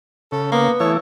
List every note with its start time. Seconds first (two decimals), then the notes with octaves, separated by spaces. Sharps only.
0.32 C#3 A4
0.52 A#3 B3
0.80 E3 A3 E4 C#5